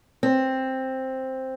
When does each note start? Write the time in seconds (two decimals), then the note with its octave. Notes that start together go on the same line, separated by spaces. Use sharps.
0.23 C4